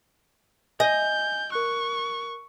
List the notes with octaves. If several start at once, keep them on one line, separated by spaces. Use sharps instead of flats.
D#5 G#5 G6
A#4 C#6 F#6